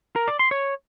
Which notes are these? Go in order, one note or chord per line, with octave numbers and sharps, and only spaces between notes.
A#4
D5
C6
C#5